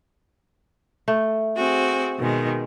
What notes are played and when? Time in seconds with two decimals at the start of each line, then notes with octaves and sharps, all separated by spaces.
1.08 A3
1.56 C4 F#4 G#4
2.19 B2 D#3 G#3